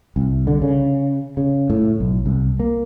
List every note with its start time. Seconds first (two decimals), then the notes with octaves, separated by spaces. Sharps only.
0.16 C2
0.47 D3
0.62 C#3
1.37 C#3
1.70 A2
2.00 B1
2.26 C2
2.60 A#3